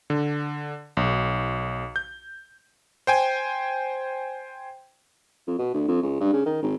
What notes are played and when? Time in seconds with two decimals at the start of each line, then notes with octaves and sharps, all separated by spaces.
0.10 D3
0.97 B1
1.96 G6
3.07 C5 G5 G#5
5.47 F2
5.59 B2
5.74 D2
5.88 F2
6.02 C#2
6.21 G2
6.33 C#3
6.46 D#3
6.63 G#1